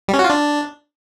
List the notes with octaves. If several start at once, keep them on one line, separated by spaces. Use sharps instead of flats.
G3
C#4
F#4
F4
D4